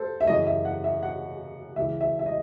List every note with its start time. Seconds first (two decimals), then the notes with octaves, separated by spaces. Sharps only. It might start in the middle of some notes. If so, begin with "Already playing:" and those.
Already playing: A4 C5
0.21 E5
0.27 F#2 C#3 E3 D#5
0.47 E5
0.65 F#5
0.84 E5
1.03 F#5
1.76 C#2 C#3 E3 E5
2.01 E5
2.19 E5
2.26 D#5